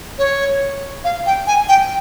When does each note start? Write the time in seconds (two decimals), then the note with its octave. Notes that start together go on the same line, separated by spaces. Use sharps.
0.18 C#5
1.04 F5
1.26 G5
1.47 G#5
1.68 G5